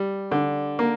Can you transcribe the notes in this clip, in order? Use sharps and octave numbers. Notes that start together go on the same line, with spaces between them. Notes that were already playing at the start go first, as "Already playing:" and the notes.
Already playing: G3
D3
A#3